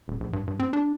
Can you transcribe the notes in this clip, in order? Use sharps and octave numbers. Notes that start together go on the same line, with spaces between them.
D#1
A#1
G2
G2
C4
D4